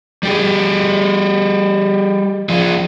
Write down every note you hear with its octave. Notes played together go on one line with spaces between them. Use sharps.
G3 G4 G#4
F3 G#4